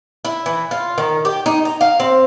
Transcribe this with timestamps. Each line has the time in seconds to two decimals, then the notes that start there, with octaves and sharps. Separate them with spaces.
0.25 E4
0.46 E3
0.71 F4
0.98 D#3
1.25 G4
1.46 D#4
1.65 A#5
1.81 F5
2.00 C4